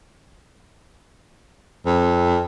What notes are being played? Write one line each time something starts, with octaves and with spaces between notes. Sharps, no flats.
F2